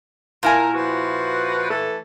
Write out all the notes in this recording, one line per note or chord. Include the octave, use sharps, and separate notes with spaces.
A#2 E4 A#4 G#5
F3 F#4 B4
E3 A3 A4